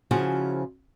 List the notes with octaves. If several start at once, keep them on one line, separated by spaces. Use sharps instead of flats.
C#3 F3 E4 F#4 G#4 C5